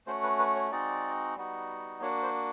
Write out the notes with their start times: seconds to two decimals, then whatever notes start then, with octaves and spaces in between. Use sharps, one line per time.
0.07 A3 C#4 F#4 C5
0.23 B4
0.39 B4
0.55 C#5
0.72 G#3 C4 D#4 F#4 D5
1.36 G3 B3 D#4 F#4
2.01 A#3 D4 F#4 C#5
2.23 C5